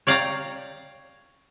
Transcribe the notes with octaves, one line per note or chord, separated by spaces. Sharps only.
C#5 D5 F5 G5 A#5